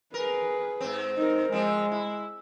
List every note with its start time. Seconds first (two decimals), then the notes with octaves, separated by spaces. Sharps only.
0.14 G#4 A#4 B4
0.81 G#2 C4
1.17 D#4 A#4
1.52 F3 G#3 C4
1.91 E4